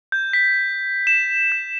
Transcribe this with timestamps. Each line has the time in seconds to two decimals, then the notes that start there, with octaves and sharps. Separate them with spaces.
0.12 G6
0.33 B6
1.07 E7
1.52 G6